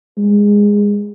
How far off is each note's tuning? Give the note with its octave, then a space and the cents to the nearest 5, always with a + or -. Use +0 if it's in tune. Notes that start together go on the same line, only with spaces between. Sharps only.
G#3 -15